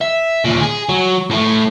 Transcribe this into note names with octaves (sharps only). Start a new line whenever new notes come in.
E5
D#2 A#2
G#4
F#3
A2 A3